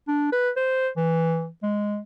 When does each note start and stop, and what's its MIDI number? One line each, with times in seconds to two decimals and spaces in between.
0.08 0.31 62
0.32 0.50 71
0.56 0.89 72
0.97 1.48 52
1.63 1.99 56